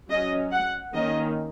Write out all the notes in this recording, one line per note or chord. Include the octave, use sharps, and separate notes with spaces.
F#3 C#4 D#5
F#5
D#3 A#3 C#4 D#5